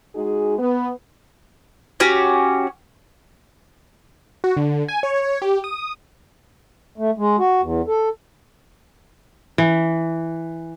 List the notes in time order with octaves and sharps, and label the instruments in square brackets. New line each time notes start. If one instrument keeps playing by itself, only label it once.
[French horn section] G#3 D#4 F#4 G#4
B3
[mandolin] C#4 F#4 G4
[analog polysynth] F#4
D3
G#5
C#5
G4
D#6
[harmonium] A3
G#3
F#4
E2
A4
[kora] E3